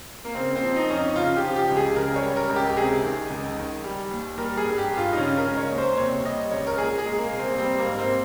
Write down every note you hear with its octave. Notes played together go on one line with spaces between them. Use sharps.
A#3
C#3 C4
C4
F3
D#4
F2 C#4
D#4
C#3 F4
G4
F3
G4
C#2
G#4
C#3 A#4
C#5
G3
A#4
C#2
G4
C3 G#4
D#3
C#2
D#3
G3
D#2
G3 A#4
G#4
G2
G4
G2
F4
D#4
C#3 C#4
A#4
G#3
C#5
D#2
C5
C3 C#5
G3 D#5
C#2 C#5
A#4
A#2 G#4
G#4
G#3
A#3
C2
C4
G3 C4
A#3
G#2
C4